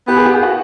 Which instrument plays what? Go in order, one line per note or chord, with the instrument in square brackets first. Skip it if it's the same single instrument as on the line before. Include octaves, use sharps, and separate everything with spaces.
[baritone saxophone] B3 [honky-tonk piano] G4
[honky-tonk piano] G#4
G4
G#4
F#4